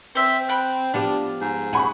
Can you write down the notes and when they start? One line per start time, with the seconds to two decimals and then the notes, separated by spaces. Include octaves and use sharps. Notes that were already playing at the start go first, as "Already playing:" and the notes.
0.15 C4 C5 E5
0.49 G5 B5 F#6
0.94 F3 B3 D4 G4
1.41 G#2
1.73 G#4 F#5 B5 C#6